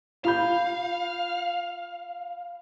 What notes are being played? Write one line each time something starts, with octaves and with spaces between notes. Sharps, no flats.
F4 F5 B5 G6